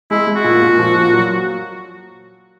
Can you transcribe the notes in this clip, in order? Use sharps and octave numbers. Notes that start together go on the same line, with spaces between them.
G#3 E4
G#3
F#4
A#2
A#2
F3
A#2
F#3